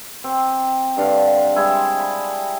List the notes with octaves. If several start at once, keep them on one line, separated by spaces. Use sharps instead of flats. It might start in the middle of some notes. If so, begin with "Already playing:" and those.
C4
G2 D3 D4 F5
G3 G#3 E4
B5